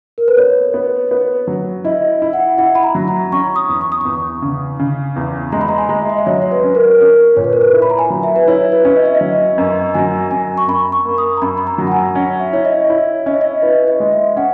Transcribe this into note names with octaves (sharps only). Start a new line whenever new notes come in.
A#4
B4
B3 C#5
B3
B3
F#3
E4 D#5
E4
F#5
E4 F#5
B5
A#5
F#3
A#5
C#4 C#6
D#6
E2
C#6
D#6
E2 C#6
C#3
C#3
E2
G#3 A#5
B5
A#5
G#5
G#3
E5
D#5
E5
F#3 C#5
C#5
B4
C#4
A#4
C#4 A#4
A#2 C#5
B4
A#4
B4
E4
B5
A#5
G#5
F#3
E5
B4
E4 C#5
B4
C#4
D#5
E5
D#5
F#3
F#2
F#3 G#5
F#2 G#5
C#6
F#2 B5
C#6
A#3
D#6
A#5
F#2 B5
B5
A#5
F#3
F#5
G#5
C#4 F#5
E5
E4 C#5
D#5
E4 C#5
C#4 D#5
C#5
D#5
E4 B4
D#5
G#3
E5
C#4 F#5